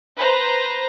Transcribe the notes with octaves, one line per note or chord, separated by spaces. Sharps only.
B4 C5 A#5